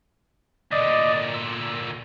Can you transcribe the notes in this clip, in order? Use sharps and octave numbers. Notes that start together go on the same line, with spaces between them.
D2 A#2 D5 D#5
E6